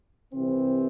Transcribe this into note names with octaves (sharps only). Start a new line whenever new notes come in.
C2 C3 E3 C4